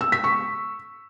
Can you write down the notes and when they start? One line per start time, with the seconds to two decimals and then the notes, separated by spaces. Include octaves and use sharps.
0.01 E6
0.12 B6
0.24 C#6